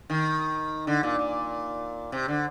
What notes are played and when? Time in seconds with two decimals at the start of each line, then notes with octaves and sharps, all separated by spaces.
0.10 D#3
0.87 D3
1.03 A#2
1.19 A#2
2.12 C3
2.28 D3